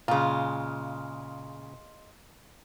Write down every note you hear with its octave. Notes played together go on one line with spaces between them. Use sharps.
A#2 C#3 G#3 F4